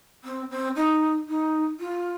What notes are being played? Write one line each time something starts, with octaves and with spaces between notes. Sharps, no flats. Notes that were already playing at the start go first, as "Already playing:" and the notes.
C4
C4
D#4
D#4
F4